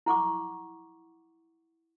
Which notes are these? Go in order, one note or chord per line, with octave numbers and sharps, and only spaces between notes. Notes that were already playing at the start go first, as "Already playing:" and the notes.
E4 F#5 C#6 D6